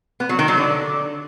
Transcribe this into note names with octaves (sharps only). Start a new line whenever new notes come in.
B3
F#3
D#3
F#3
D3